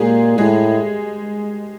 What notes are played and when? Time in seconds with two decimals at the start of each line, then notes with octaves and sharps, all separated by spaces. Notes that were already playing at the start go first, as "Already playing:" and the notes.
Already playing: A#2 G#3 G4 G#4
0.38 A2 G#3 G#4